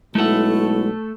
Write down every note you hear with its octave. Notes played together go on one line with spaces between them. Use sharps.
B1 G#3 A3 E4 A4 F#5